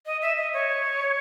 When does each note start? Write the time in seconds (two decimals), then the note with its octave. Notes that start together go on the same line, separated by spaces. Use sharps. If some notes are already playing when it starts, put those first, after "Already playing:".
0.06 D#5
0.22 E5
0.37 D#5
0.53 C#5